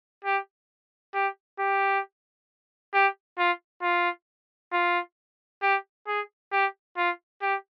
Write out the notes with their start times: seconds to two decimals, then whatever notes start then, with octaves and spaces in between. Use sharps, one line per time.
0.25 G4
1.14 G4
1.59 G4
2.94 G4
3.38 F4
3.83 F4
4.73 F4
5.63 G4
6.07 G#4
6.52 G4
6.97 F4
7.42 G4